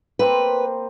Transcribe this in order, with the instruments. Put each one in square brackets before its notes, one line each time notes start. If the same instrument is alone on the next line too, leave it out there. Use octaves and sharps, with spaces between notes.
[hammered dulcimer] A#3 C4 C5 [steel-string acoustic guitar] B4